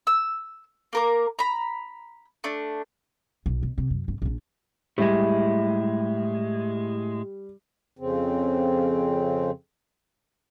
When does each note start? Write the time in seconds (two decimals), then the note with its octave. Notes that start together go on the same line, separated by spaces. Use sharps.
0.07 E6
0.93 A#3 A#4 D6
1.39 A#5 B5
2.44 A3 D4
3.46 B1
3.63 B2
3.78 C3
3.90 F#2
4.08 G1
4.22 A#1 D4
4.98 A2 G3 G#3 E4
7.99 F2 C#3 C4